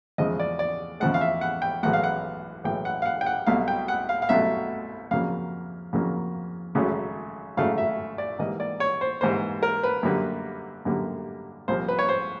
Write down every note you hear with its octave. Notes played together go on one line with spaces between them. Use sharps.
E2 C#3 F3 G#3 D#5
D5
D5
E2 C#3 F3 G#3 F#5
F5
E5
F#5
G5
B1 A2 E3 G#3 F#5
F5
F#5
B1 A2 E3 G#3 G5
F#5
F5
F#5
G5
F#5
C2 B2 F#3 A3 F5
G5
F#5
F5
F5
C2 B2 F#3 A3 E5
F2 C#3 F#3 A#3 F5
F2 C#3 F#3 A#3
G#1 F#2 C#3 F#3 A3
G#1 F#2 C#3 F#3 A3 F5
E5
D5
G#2 E3 G3 A#3 D#5
D5
C#5
C5
G#2 E3 G3 A#3 C5
A#4
B4
F#2 D3 G3 A#3
F#2 D3 G3 A#3
C2 A#2 F3 A#3 C5
B4
C#5
C5